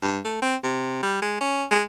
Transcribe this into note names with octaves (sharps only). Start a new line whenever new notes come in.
G2
A3
C4
C3
G3
G#3
C#4
G#3